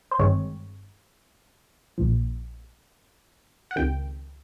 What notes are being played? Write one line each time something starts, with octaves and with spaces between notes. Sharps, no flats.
C5
G1 G2 D#3 G#3 C4 C#5
A#1 A#2 F3
F#5
C#2 C3 D#3 G5